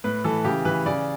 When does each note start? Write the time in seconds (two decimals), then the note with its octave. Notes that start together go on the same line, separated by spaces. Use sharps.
0.04 A2 B4
0.24 E3 A4
0.44 C#3 G4
0.65 E3 B4
0.86 C#3 D5